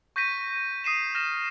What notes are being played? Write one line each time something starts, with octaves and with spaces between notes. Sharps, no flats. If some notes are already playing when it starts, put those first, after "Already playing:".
C#6 G6 A#6 B6 D#7
D#6 C7 D#7 E7
F6 A#6 D#7 E7